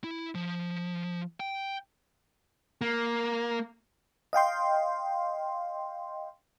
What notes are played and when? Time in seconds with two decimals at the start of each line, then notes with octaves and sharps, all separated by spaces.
0.04 E4
0.35 F3
1.40 G5
2.81 A#3
4.33 D#5 F5 G5 C6